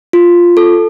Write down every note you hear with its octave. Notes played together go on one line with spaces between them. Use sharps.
F4
A4